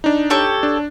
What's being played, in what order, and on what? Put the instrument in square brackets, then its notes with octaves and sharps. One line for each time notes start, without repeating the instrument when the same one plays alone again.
[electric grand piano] D4 D#4
[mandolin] G4 A4 C#5
[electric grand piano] D4